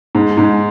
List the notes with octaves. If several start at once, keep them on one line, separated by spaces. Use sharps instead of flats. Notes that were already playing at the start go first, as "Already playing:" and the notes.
G#2
G#2